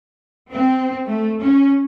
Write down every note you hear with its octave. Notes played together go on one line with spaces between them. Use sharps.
C4
A3
C#4